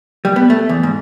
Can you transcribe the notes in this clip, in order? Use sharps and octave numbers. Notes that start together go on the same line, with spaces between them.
G3
B3
A3
E2
G#2